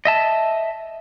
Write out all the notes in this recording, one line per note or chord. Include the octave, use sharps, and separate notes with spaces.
D#5 E5 A5